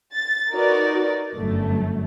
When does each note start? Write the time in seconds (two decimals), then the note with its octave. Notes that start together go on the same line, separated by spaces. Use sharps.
0.16 A6
0.52 D#4 F#4 A#4 B4 D5
1.36 G1 F#2 A3